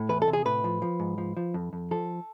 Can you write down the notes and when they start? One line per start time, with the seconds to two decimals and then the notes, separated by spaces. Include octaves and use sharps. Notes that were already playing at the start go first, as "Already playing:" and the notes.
Already playing: A2
0.09 E2 B4
0.22 A4
0.28 C3
0.33 G#4
0.45 A2 B4
0.64 F3
0.82 F3
1.00 G#2
1.18 F3
1.37 F3
1.54 F2
1.73 F2
1.91 F3 A4